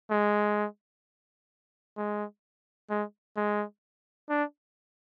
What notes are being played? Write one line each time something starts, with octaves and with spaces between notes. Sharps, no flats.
G#3
G#3
G#3
G#3
D4